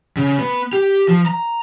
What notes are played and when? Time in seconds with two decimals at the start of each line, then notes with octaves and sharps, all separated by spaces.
0.17 C#3
0.38 B3
0.73 G4
1.08 F3
1.26 A#5